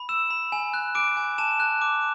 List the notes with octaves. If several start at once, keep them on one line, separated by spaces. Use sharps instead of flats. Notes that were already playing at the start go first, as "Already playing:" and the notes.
Already playing: B5
E6 E7
B5
G#5
F#6
D6 D7
G#5
A5 E7
F#6
D6